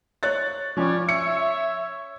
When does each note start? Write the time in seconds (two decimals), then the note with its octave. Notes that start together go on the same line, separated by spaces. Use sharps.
0.23 C#5 F#6 A6
0.77 F3 G3 C#4 C#5 D5
1.09 C#5 E5 C#7